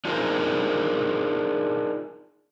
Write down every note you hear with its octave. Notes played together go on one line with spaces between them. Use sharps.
D4 D#4 F4 G#4 A#4 C5